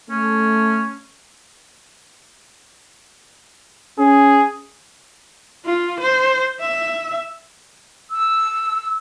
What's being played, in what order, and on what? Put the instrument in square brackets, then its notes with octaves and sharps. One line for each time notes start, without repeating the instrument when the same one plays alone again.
[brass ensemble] A3 [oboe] C#4
[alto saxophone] C#4 [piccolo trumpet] G#4
[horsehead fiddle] F4
C5
E5
[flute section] E6